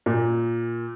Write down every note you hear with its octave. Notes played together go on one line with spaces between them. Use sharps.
A#2